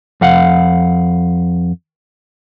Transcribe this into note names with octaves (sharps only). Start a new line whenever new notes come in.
F2 F5 F#5